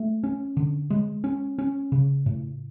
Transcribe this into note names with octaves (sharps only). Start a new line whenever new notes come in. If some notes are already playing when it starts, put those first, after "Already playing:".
Already playing: A3
C#4
D3
G#3
C#4
C#4
C#3
A2